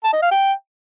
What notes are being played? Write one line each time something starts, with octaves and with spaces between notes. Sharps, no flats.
A5
D#5
F5
G5